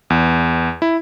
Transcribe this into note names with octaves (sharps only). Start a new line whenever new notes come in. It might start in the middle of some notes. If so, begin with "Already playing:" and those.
E2
E4